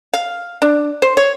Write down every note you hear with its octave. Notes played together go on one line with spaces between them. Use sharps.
F5
D4
C5
C#5